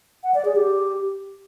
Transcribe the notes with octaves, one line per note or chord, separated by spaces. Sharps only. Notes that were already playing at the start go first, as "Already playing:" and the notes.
F#5
D5
G#4
G4